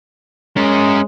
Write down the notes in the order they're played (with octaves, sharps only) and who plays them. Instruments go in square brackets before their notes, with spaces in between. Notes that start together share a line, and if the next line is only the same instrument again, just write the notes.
[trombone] G#3 [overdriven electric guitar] C#4 A#4